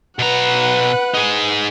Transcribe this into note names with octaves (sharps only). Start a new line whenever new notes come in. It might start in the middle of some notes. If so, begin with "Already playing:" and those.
B2 B4 F#5 A#5
D#4 G#4